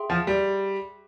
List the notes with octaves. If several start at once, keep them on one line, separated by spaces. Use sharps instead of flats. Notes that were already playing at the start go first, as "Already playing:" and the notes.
Already playing: G#4 E5 G5 C6
F3
G3